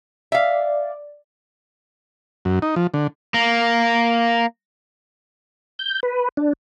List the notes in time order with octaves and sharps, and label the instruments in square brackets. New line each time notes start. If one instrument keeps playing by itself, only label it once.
[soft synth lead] D5 [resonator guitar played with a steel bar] E5 F5
[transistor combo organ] F#2
D#4
F3
D3
[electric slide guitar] A#3
[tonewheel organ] G6
B4
D4